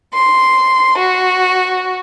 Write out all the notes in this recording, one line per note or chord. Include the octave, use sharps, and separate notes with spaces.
C6
F#4